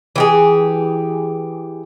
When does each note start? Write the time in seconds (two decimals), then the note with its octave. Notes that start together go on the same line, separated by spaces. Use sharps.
0.16 E3 G4 G#4